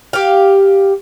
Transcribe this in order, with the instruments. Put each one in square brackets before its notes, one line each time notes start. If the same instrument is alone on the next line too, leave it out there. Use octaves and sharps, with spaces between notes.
[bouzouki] G4 F5